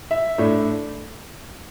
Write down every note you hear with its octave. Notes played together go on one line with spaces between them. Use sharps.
E5
A2 A3 D4